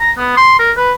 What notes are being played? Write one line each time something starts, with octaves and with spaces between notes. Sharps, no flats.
A#5
B3
C6
A#4
B4